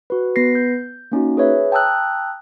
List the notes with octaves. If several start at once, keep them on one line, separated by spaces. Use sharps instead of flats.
F#4 B4
B3 B4 A#6 C7
G6
A#3 C#4 D#4 F#4
G#4 B4 C#5 E5
G5 A5 A#5 D#6 E6 F#6